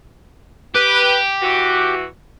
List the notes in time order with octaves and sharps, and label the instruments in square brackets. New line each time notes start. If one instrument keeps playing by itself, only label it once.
[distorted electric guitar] G4 [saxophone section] B4
[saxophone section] E3 F#4